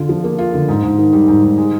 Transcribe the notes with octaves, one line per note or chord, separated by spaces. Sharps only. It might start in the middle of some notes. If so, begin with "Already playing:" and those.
Already playing: D3 F4
F3
A#3
F4
D3
G#2
G#2
D#3
G3
G#2
G#2
G#3